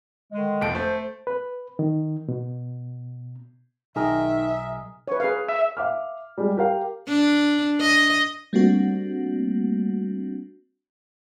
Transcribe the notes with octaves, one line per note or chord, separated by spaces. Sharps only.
D3 D#3 G#3
F1 F2 D7
A3 C5
B4
D#3
B2
B1 D#3 G#4 A#4 D#5 E5
B4 C#5
G#4 B4 F5
E5
E5 F5 D6 F6
G3 G#3
G4 A#4 F5
D4
D#5
G3 A3 A#3 C4 D4 F#4